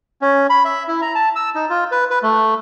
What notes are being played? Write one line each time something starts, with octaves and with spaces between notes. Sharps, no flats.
C#4
B5
E5
E4
A#5
A5
E6
D#4
F4
B4
B4
A3